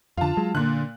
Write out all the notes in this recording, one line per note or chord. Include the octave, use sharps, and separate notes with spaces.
F2 D3 F4 A5
F#3 G#3
A#2 D3 F#6